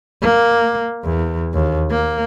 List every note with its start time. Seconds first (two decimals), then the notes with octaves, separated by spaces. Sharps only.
0.21 A#3
1.04 E2
1.53 D#2
1.90 A#3